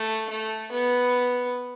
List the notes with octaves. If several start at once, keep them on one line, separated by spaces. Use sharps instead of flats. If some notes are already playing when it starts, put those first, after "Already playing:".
Already playing: A3
A3
B3